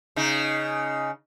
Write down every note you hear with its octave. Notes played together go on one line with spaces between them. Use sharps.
C#3 D#4